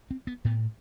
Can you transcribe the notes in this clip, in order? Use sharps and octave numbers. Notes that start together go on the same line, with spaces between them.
C4
B3
A2 B3